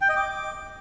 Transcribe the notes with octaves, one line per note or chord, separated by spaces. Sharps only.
G5
D#5
D6